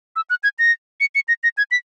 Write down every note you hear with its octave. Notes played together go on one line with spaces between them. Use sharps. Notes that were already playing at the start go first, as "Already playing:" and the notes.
E6
F#6
G#6
A#6
C#7
C#7
A#6
A#6
G#6
B6